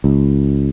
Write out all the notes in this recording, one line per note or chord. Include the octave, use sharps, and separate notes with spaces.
C#2